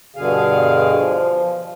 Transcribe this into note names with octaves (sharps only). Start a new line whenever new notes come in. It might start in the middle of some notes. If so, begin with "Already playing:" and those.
G2 B2 D3 G#4 F5
F3